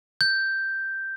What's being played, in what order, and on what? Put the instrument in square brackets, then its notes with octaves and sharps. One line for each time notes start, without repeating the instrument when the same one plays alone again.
[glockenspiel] G6